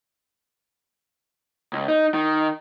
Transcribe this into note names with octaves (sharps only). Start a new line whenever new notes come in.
C#2
D#4
D#3